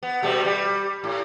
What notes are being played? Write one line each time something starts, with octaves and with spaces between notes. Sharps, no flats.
B3
B2 G3 A3
G3
A2